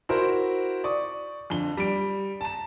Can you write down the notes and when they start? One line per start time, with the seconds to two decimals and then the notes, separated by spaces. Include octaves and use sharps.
0.09 E4 F#4 A#4 C5
0.84 D5 C#6 D#6
1.50 F2 D3 G7
1.77 G3 D7
2.41 A5 A#5 E7